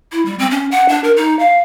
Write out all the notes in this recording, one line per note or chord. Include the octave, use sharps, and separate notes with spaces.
E4
G3
C4
C#4
F#5
D4
A#4
D#4
F5